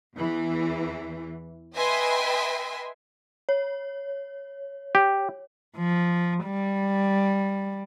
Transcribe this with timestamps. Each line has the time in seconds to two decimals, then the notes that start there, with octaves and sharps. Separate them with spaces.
0.17 E2 E3
1.76 B4 D#5 E5 G5 G#5 C6
3.49 C#5
4.95 G4
5.77 F3
6.45 G3